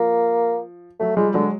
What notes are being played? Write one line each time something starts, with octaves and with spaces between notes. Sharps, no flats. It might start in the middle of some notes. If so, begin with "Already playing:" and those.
Already playing: F3 A#3
F#3 A3
F3 G3 G#3
D3 F#3 G#3